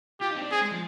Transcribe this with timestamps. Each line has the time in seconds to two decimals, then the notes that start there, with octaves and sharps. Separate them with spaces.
0.20 F4 G4
0.31 D#4
0.36 C4
0.41 D4
0.51 C4 G#4
0.61 G#3
0.72 F3